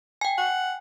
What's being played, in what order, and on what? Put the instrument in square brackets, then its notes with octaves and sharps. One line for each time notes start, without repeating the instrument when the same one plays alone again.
[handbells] G5 G#5
[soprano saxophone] F#5